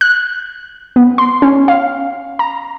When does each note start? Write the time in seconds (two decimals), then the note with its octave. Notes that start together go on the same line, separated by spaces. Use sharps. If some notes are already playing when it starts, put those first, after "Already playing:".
0.01 F#6
0.96 B3
1.18 C6
1.42 C#4
1.68 F5
2.39 A#5